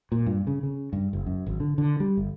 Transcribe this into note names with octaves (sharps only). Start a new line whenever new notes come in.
A#2
G2
C#3
C#3
G2
F#1
F#2
G#1
D3
D3
G3
G1